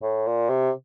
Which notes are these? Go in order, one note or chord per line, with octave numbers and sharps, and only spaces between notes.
A2
A#2
C3